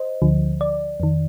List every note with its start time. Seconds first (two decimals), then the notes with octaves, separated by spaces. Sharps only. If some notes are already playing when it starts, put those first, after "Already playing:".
Already playing: C5 D#5
0.22 D2 D3 F3
0.61 D5
1.00 F2 D#3